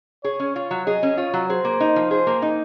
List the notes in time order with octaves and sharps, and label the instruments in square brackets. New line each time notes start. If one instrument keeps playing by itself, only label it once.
[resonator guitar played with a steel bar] G#4 [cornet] C#5
[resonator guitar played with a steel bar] C#4
[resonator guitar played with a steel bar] F4 [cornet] C#5
[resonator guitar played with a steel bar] F#3
[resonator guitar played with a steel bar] G#4 [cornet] D#5
[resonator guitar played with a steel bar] C#4
[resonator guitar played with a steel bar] F4 [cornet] C#5
[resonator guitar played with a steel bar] F#3
[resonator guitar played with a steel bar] G#4 [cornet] C5
[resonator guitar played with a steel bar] A#3
D#4
F3
[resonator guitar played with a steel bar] G#4 [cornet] C5
[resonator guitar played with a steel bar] A#3
D#4